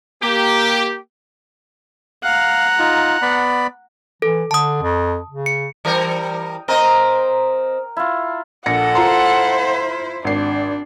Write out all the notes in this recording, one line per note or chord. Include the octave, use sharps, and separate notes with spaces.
A#3 G4
F5 F#5 A#5
D#4 F4
B3 D5 B5
E3 A4
D3 A5 D#6
F2
C#3
C#7
E3 G3 A#4 D#5 G5
C4 A#4 D#5 A#5
E4 F4
A#1 A4 F#5 A#6 C#7
E4 F4 C5 A#5 C6
G#1 D4 C7